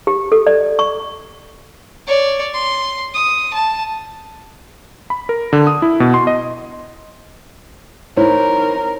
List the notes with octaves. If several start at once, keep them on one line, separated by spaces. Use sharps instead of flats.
G4
A4
D5
C#6
C#5 D5
C6
D#6
A5
B5
A#4
D3
D#6
E4
B2
C6
D#5
D#4 E4 A#4 C5 C#5